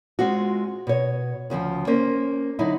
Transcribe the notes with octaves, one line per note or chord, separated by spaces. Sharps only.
G#3 C4 F4 F#4
B2 C#5
D2 C#3 E3 F3
A#3 C#4 C5
D3 F#3 D#4 E4